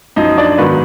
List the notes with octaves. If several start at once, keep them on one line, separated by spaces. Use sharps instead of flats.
F#2 F3 D#4 D#5
D4 D5
G#2 D#3 F#3 B3 B4